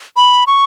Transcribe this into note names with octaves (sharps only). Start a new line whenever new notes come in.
B5
C#6